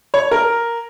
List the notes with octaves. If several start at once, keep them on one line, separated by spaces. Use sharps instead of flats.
C#5
A#4